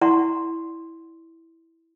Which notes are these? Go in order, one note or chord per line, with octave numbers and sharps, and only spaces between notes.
E4 D5 F#5 A#5 C6 C#6